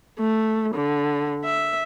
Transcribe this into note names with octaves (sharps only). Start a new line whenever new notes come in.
A3
D3
E5